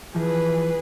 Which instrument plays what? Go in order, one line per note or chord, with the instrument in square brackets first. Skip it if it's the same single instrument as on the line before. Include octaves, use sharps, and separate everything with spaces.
[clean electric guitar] E3 F3 [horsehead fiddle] G#4 B4